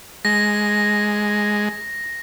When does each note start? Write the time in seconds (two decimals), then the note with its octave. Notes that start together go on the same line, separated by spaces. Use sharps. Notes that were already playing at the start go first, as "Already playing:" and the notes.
0.25 G#3 A#6